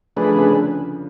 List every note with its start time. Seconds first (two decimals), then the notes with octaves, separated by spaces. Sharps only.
0.16 F3 A3 D4 G#4 B4
0.30 D3
0.36 C#3